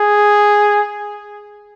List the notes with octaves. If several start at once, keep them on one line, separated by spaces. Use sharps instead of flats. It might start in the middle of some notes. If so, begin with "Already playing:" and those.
Already playing: G#4